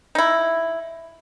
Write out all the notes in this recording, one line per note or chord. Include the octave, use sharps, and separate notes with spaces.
D#4 E4